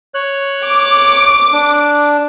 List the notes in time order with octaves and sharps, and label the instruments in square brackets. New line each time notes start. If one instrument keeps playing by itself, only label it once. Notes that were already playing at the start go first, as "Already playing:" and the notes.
[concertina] C#5 F#6
[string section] D6
[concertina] D4